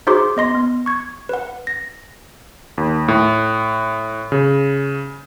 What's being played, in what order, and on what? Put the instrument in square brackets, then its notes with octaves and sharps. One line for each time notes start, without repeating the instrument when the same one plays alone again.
[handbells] D#4 F#4 G#4 C5 C6 D6
B3 D#5 C6 A#6
B3
C#6 G#6
B4 F#5
A#6
[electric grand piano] D#2
A2
C#3